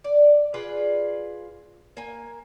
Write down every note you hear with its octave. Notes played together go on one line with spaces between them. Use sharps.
D5
F4 G#4 B4 D5
A#3 G#5